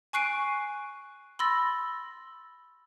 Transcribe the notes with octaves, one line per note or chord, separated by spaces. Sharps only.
G#5 C#6 F#6 C7 D7 D#7
B5 C6 E6 A6 A#6